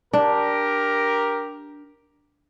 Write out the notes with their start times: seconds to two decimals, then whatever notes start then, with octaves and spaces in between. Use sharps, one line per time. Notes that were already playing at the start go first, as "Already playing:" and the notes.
0.13 D4 G4 A#4